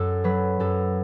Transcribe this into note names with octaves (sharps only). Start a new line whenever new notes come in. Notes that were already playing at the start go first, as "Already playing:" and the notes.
Already playing: F#2 A4
F#3 B4
F#2 A4